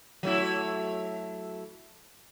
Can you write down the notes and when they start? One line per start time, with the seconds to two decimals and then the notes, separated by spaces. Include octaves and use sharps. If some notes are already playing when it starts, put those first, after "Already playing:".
0.23 F#3 A3 E4